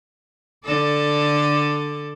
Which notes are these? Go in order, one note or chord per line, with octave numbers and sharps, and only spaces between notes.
D3 A4 D5